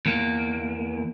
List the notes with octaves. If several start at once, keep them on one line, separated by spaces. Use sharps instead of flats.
E2 A#3